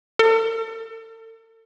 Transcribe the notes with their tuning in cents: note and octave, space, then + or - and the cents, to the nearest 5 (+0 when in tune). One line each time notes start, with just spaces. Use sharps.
A4 +45